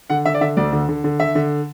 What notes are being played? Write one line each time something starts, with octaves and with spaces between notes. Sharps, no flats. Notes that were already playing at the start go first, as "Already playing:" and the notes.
D3 F#5
D3 E5
D5
D3 E5
D2 D5
D3
D3
D3
D3 E5
D3